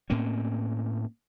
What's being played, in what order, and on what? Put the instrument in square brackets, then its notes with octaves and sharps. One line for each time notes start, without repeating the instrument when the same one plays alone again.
[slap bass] A2 A#3 C4 C#4